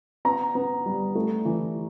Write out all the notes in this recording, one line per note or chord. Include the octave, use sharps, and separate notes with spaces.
B3 A#5
B3
G3
A3
E3